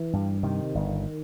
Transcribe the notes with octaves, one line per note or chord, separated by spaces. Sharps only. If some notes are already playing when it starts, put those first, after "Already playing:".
Already playing: E3
G2
C3 D#3
G1